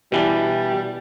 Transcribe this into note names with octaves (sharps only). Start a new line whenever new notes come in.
B2 E3 G3 D4